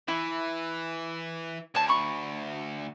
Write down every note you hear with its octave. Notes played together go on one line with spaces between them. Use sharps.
E3 E4
D2 C#5 A5
A#5 B5 C#6